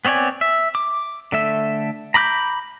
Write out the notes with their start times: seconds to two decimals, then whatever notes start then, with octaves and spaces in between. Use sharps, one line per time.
0.05 B3 C4 C#5 D5 G#5
0.41 E5
0.75 D6
1.32 D3 A3 E5
2.14 A#5 B5 D6 F#6 G6